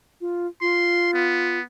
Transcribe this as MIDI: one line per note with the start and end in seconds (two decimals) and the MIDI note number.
0.21 0.47 65
0.61 1.58 65
0.61 1.11 84
1.14 1.62 59